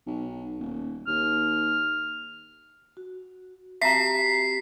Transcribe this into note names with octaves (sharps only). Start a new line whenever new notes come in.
B1
D#1
D#2 F6
F#4
C4 F#4 G4 E5 A5 A#5 B6 C7